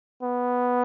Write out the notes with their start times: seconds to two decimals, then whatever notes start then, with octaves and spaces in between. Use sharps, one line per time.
0.23 B3